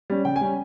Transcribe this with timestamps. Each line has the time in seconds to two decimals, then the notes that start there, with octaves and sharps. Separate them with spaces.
0.10 G3 C#4
0.25 C#3 G5
0.36 G#5
0.41 G3 C#4